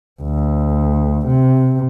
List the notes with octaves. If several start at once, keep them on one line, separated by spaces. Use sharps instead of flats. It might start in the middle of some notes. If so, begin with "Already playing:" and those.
D2
C3